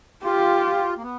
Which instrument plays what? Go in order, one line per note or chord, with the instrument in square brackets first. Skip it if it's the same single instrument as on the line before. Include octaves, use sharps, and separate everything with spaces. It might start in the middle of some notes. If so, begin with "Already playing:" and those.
[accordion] F4 [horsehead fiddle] G4
[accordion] A#3
B3